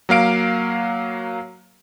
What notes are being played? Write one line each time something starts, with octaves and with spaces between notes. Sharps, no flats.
F#3 A#3 F5 D7